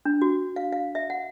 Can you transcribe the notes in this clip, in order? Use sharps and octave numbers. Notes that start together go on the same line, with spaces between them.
D4
F#4
F5
F5
E5
F#5